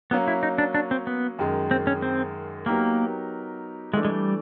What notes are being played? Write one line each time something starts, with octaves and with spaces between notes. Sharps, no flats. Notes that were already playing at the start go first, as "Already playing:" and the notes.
F#3 A#3 B3 C#4
E4
D#4
D4
D4
C4
B3
F#2 D#3 G#3
C4
C#4
C4
F#3 A#3 B3 D#4 G4 A#4
E3 G#3 A3 D4
G#3
G3